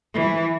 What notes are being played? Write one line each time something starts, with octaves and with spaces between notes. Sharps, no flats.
E3